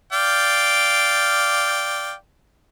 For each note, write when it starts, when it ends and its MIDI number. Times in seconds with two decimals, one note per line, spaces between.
0.13 2.13 74
0.13 2.13 77
0.13 2.13 79